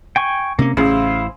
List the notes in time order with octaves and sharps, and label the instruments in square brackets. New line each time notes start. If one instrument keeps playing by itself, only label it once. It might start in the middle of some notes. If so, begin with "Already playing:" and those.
[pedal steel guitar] G5 G#5 C#6
[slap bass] C3 C#4 [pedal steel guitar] A#3
[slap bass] A1 [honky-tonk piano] C#3 [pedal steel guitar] E4 C5 F5